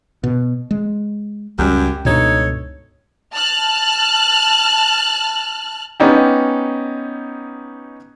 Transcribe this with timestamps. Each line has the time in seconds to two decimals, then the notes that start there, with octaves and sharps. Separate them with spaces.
0.24 B2
0.71 G#3
1.59 C#2 F#2 G3 G4
2.05 C#2 G2 B2 D#4 A4 C#5
3.34 A5 F6 F#6
6.00 B3 C#4 D#4 G4